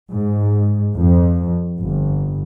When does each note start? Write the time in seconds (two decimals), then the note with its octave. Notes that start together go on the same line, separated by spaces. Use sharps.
0.12 G#2
0.95 F2
1.77 G1